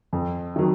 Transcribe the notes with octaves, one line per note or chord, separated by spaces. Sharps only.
F2
D#3 F#3